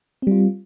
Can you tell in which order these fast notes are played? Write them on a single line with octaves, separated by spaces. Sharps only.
C4 G3 F4